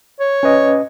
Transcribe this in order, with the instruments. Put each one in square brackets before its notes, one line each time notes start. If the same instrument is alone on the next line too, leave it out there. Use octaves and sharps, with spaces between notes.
[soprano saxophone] C#5
[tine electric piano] C#4 B4 D#5